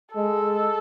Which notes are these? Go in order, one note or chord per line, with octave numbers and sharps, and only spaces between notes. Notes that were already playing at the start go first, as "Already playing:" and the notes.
G#3 A4